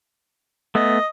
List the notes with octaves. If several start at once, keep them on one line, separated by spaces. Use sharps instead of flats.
A3 B3 D#5